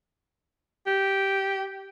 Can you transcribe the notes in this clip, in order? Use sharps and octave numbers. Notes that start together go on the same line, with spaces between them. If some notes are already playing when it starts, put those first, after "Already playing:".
G4